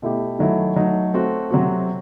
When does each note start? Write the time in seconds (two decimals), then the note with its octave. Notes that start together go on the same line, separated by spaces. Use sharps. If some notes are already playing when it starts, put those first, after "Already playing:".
0.02 B2 A3 E4 G4
0.39 D#3 F#3 A3 E4
0.76 F#3 A3 D#4
1.14 A3 C4 F#4
1.51 C3 F#3 C4 F#4